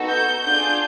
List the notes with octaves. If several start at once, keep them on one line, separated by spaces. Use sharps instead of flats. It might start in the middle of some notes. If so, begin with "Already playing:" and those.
Already playing: B3 D#4 F#4 A4
G6
D4 F4 G#4 G6